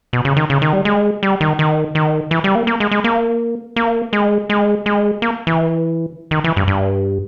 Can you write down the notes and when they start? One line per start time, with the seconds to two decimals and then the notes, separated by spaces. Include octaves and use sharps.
0.13 B2
0.25 C#3
0.37 D#3
0.50 C#3
0.62 D#3
0.73 G3
0.85 G#3
1.23 G3
1.41 D#3
1.59 D#3
1.95 D#3
2.31 E3
2.44 G3
2.55 A#3
2.67 A#3
2.80 G#3
2.91 G#3
3.04 A#3
3.76 A#3
4.13 G#3
4.50 G#3
4.86 G#3
5.22 A#3
5.47 E3
6.31 D#3
6.44 E3
6.56 G2
6.68 G2